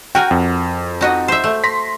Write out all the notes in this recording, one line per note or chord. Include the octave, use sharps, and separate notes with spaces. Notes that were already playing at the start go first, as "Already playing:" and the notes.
F#4 A#4 G5 G#5
F2
D#4 F#4 D#5
C5 E5
A3
C6 A#6 B6